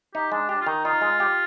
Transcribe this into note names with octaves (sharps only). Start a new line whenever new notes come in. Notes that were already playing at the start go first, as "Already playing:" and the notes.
D#4 G4
G#3 D4
D4 G4
F4
D#3 D#4
D#4 F4
G#3
G4